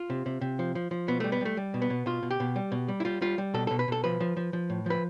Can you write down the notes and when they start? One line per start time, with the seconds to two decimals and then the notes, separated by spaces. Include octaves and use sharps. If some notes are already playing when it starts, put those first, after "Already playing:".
Already playing: F4
0.10 C3
0.26 C3
0.41 C3
0.59 F3
0.75 F3
0.91 F3
1.08 B2 B3
1.20 G3 A3
1.32 B3
1.41 G3 A3
1.57 G3
1.74 B2
1.82 B3
1.90 B2
2.06 B2 F4
2.23 B2
2.31 G4
2.40 B2
2.56 G3
2.72 B2
2.88 G3
3.00 E4
3.05 G3 F4
3.22 G3 F4
3.38 G3
3.54 B2 A4
3.67 B2 A4
3.79 B4
3.88 B2 A4
4.04 F3 B4
4.20 F3
4.37 F3
4.53 F3
4.70 A2
4.86 F3 B4